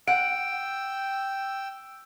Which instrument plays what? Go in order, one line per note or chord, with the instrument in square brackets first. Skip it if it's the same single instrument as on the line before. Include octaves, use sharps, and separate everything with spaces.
[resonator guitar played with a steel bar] F#5 [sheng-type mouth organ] G5 E6 [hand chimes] D7